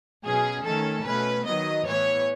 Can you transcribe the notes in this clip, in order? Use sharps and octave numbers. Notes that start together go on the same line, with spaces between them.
B2 F#3 C#4 G#4
D#3 A3 C#4 A4
B2 A3 C#4 B4
D#3 F#3 B3 D#5
A2 E3 B3 C#5